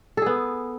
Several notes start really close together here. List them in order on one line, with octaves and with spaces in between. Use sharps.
A4 G#4 B3